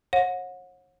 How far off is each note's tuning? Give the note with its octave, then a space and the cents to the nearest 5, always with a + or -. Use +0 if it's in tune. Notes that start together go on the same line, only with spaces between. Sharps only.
C#5 -35 F#5 -35